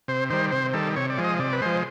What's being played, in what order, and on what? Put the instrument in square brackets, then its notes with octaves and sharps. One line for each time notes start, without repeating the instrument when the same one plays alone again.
[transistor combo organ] C3 C5
D#3 G3 C5
C3 C5
D#3 G3 A4
C3 C#5
D5
F3 G#3
D#5
C3 D5
B4
F3 G#3 C5